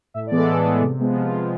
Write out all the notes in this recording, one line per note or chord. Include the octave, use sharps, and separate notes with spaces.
A2 E5
D5
E3 G#3 B3
A4
A2 G#4
E3 G#3 B3
C3
F3 G#3 B3
C3 F4
F3 G#3 B3